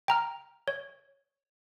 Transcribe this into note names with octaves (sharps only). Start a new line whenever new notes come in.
G5 A#5 F6
C#5